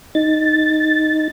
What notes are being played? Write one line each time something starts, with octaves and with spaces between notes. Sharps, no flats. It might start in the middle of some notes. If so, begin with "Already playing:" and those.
D#4 A6